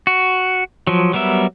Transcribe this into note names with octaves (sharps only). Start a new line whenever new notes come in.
F#4
F3 F#3
F#3 G3 B3 A#4 E5